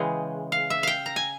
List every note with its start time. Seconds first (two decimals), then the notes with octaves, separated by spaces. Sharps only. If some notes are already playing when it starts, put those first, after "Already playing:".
Already playing: C#3 E3 G#3 G5
0.52 F5
0.70 E5
0.83 F5 G5
1.06 A#5
1.16 G#5